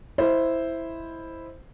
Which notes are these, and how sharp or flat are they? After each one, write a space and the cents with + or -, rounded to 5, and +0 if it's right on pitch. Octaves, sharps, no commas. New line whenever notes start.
E4 +0 C5 +0 D#5 +0